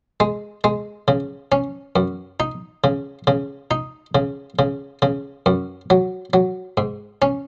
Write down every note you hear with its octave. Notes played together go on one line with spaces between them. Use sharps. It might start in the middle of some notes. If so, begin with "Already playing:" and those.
G#3
G#3
C#3
C#4
F#2
D#4
C#3
C#3
D#4
C#3
C#3
C#3
F#2
F#3
F#3
G#2
C#4